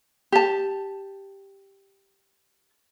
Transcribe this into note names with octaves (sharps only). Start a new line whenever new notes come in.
G4 A5